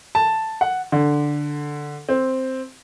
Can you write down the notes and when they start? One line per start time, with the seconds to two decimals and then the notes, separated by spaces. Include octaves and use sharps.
0.15 A5
0.61 F#5
0.92 D3
2.09 C4